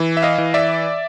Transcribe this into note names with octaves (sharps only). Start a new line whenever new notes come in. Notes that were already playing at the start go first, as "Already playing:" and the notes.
Already playing: E3
E5
D#5 F5
E3
D5 E5